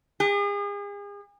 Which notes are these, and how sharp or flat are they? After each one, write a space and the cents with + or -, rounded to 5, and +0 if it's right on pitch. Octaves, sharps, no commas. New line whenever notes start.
G#4 -40